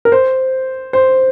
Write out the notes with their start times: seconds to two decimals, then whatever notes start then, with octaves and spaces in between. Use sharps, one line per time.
0.05 A#4
0.12 C5
0.93 C5